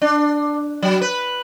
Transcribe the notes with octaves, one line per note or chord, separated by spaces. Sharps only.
D4
F#3
B4